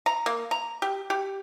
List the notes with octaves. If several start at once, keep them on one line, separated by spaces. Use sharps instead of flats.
A#5
A#3
A#5
G4
G4